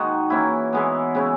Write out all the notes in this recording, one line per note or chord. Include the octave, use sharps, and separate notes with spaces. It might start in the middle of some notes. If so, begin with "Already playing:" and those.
Already playing: D#3 G#3 D#4 F#4
E3 A#3 C#4 E4
E3 G#3 B3
C#3 G#3 C#4 E4